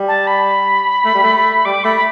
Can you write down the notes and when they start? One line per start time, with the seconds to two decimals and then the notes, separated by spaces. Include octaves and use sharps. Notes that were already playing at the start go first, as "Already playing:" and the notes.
Already playing: G3
0.08 A5
0.27 B5
1.05 A3
1.15 G3
1.23 A3
1.65 G3 D6
1.84 A3 B5
1.96 B5